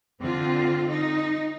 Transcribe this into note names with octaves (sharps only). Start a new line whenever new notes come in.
D3 C4 F4
D#4